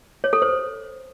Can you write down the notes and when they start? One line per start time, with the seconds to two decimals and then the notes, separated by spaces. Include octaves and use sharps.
0.24 C#5
0.33 A4
0.42 C5